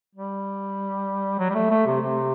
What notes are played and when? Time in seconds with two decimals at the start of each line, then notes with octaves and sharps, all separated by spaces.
0.15 G3
1.39 F#3
1.50 G3
1.55 A3
1.70 A3
1.86 C3
2.01 C3